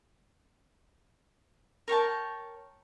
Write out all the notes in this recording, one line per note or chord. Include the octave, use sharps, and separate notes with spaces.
A#4 C#5 G5 A5